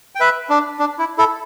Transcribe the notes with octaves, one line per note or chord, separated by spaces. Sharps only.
G5
B4 E5
D4
D4
E4
E4 A4